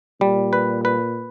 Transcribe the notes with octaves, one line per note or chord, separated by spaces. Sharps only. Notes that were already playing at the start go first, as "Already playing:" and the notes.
A#2 G3
B4
B4